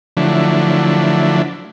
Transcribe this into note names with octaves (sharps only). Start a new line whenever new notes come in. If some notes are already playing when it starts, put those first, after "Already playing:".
D3 F3 F#3 A3 D4 E4